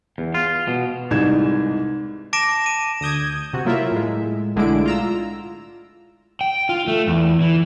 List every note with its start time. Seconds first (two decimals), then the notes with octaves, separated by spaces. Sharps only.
0.18 E2
0.34 F4
0.68 B2
1.11 C2 G#2 E3 D#4 G#6 E7
2.33 A5 D6 A#6 D7 E7
2.66 D#7
3.01 D2 D#6 G6 G#6
3.53 C3 F#4
3.65 F#3 A#3 E4 F4 A#4 E5
3.92 A2 G#3
4.56 B1 D3 G#3 A3 E4 D7
4.86 F4 A#5 E6
6.41 G5
6.69 F4
6.87 A3
7.07 E2
7.41 E3